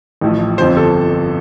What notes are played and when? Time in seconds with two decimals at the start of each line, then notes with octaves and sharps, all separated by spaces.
0.21 A1 A2 F3
0.58 G1 F2 F3 C4 C5
0.77 A4